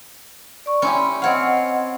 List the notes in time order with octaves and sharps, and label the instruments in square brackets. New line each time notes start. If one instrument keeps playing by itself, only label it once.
[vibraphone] D5 C#6
[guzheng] C#4 E4 G4 [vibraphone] B5 C6
[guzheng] C4 C#5 F5 [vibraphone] D#5 F#5